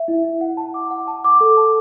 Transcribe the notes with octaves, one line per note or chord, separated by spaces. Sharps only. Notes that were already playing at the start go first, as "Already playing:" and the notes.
Already playing: E5
E4
E4
F#5
A5
D6
F#5
A5
D6
A4
A5